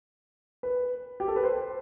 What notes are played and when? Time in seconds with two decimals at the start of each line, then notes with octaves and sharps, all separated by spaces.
0.63 B4
1.20 G4
1.28 A4
1.36 B4
1.44 C5